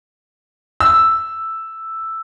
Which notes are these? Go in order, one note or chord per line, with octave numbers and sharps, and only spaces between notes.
E6